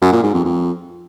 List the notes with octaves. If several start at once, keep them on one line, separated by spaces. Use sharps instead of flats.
F#2
A#2
G#2
F2
F2